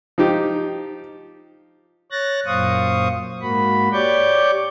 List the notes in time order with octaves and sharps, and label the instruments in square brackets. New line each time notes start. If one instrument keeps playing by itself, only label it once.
[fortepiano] F3 D#4 G4
[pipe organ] C#5 F#6 A6 A#6
F#2 A#2 C5 F5 C#6 D#6
G#2 A#3 F#4 B5
G4 C#5 D5 C#6 D6 G6